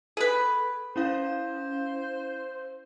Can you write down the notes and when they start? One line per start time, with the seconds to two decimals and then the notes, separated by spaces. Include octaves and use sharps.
0.17 G#4 A4 B4
0.96 C#4 E4 C5 F5